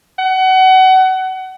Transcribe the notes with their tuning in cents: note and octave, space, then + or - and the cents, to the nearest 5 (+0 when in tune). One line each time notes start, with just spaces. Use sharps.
F#5 +30